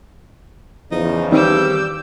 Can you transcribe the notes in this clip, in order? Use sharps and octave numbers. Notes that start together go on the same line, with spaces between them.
E2 C#3 F3 D#4
D#3 G3 C4 D6 E6 G6